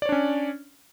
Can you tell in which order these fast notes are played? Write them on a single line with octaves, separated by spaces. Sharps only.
D5 C#5 D4 C#4